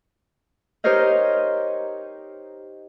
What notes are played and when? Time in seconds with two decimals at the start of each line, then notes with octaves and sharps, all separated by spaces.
0.84 D#4 G4 A#4 C5 C#5 D#5